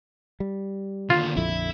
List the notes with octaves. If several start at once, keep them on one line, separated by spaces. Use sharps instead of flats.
G3
D#2 D3 F4
A#1 F2 D3 E4